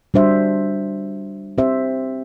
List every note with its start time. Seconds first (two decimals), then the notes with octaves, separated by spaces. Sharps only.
0.14 G3 D4 F#4 C5 E5
1.58 C4 G4 C5 E5